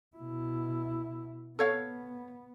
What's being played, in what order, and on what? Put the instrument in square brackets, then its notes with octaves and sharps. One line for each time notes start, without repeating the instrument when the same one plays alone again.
[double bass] B2 E4
[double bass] B3 [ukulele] A4 C#5 F5